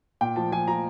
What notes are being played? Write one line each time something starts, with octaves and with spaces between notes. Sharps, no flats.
A#2 G5
F3 A5
F3 G#5
F3 A#5